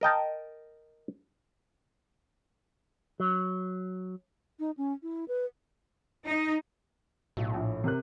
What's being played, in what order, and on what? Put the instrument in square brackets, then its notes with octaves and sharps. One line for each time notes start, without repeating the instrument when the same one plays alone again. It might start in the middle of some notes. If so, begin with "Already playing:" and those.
[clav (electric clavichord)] A#4 D#5 G5 A5
[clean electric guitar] F#3
[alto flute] D#4
C#4
E4
B4
[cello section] D#4
[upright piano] B1 [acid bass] A2
[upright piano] A#1
C3 A#4 F#6